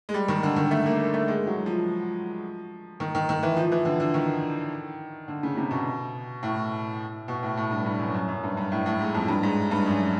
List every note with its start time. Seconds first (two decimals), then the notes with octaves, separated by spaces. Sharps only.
0.09 G#3
0.14 G3
0.28 D#3
0.43 D3
0.56 D#3
0.71 A3
0.86 A#3
1.14 A3
1.28 G#3
1.47 F#3
1.66 F3
3.00 D#3
3.15 D#3
3.29 D#3
3.43 E3
3.56 F3
3.72 E3
3.85 D3
4.00 D3
4.14 D#3
5.28 D3
5.43 C#3
5.57 C3
5.71 B2
6.43 A2
7.28 B2
7.43 A2
7.57 A2
7.71 G2
7.86 G2
7.99 F#2
8.15 F#2
8.28 F#2
8.43 G2
8.57 G2
8.72 A2
8.86 A2
9.01 G#2
9.15 F2
9.28 G2
9.43 G#2
9.71 G2
9.86 F#2